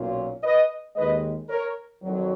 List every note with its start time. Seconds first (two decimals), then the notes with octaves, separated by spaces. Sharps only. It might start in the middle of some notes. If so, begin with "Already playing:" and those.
Already playing: B1 A#2 F#3 C#4 F4
0.43 B4 D#5
0.96 D#2 D#3 G#3 B4 D#5
1.50 A#4 C#5
2.02 F2 D#3 F#3